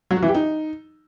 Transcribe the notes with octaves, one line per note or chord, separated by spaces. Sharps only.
F#3
F#4
E3
G4
D#4